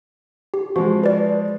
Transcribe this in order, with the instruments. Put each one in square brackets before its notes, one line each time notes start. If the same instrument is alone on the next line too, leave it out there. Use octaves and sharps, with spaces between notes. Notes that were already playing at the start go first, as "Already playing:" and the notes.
[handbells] G4
[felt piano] F3 G#3 [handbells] F#4
[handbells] B4 D5